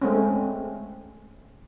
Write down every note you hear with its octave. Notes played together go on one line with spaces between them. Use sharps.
G#3 A3 C4 C#4